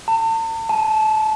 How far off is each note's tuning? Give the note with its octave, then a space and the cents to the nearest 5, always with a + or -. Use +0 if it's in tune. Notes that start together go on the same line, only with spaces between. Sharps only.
A5 +40
A5 -25